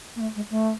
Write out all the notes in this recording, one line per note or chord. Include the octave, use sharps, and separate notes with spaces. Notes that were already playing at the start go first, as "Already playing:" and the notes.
A#3
A3
G#3
A3